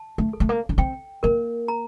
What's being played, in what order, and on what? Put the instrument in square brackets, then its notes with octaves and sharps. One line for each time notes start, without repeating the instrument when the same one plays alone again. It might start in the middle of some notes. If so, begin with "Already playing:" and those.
Already playing: [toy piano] A5
[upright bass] A3
[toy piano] A4
[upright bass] A3
A#3
D4
[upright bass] C4 [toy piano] G5
[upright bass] A#3 [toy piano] A#4
[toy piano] A#5